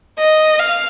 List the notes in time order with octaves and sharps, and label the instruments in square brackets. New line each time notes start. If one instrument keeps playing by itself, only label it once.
[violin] D#5
F5